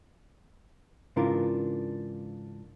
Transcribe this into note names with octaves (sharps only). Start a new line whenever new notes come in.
G#2 C#3 E3 D4 F4 A#4